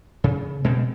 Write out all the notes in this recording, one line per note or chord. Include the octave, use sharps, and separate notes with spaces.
C#3
B2 G#3 C4